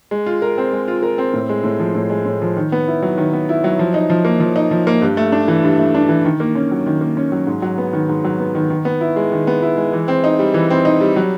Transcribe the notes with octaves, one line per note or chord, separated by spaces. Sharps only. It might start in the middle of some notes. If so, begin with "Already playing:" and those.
G#3
F4
A#4
C4
G#3
F4
A#4
C4
A2
G#3
A2
F3
A2
G#3
A2
F3
D#3
B3
E4
F#3
D#3
B3
E4
F#3
F3
D#4
F3
A#3
F3
D#4
F3
A#3
G2
A3
D4
E3
G2
A3
D4
E3
D#3
A#3
C#4
F#3
D#3
A#3
C#4
F#3
G#2
F#3
B3
D#3
G#2
F#3
B3
D#3
D#3
B3
E4
G#3
D#3
B3
E4
G#3
E3
C4
D#4
G3
E3
C4
D#4
G3
F#3